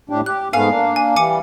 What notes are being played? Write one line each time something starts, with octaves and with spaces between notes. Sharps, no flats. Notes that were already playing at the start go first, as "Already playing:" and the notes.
A2 D4 G4
G4 F#6
G#2 A3 B3 F5 G#5
A#3 D4
G#5
E3 G3 G#5 D6 C#7